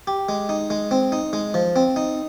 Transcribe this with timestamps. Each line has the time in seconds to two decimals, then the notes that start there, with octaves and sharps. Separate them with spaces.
0.07 G4
0.29 G#3
0.49 D#4
0.70 G#3
0.91 C4
1.12 D#4
1.33 G#3
1.54 F3
1.76 C4
1.96 D#4